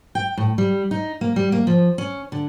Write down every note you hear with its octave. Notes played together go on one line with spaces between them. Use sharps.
G5
A2
G3
D#4
A#3
G3
A#3
F3
C#4
D3